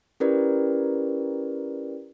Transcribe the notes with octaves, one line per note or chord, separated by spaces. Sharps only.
C#4 E4 G4 A#4 B4 D5